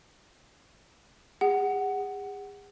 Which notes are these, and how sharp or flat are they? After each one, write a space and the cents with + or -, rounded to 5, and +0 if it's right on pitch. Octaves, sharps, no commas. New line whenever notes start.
G#4 -40 F#5 +10